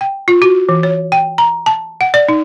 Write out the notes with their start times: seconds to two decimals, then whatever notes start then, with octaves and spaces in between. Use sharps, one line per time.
0.01 G5
0.28 F4
0.42 F#4
0.69 E3
0.83 C#5
1.12 G5
1.38 A#5
1.66 A5
2.01 F#5
2.14 D5
2.29 D#4